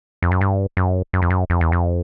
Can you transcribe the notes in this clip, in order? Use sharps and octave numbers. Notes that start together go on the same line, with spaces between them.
F2
F#2
G2
F#2
F#2
F2
F#2
F2
E2
F2